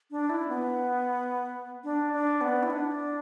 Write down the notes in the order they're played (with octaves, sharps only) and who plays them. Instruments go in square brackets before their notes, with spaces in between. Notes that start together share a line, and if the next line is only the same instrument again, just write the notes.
[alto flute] D4
E4
B3
D4
D4
B3
E4
D4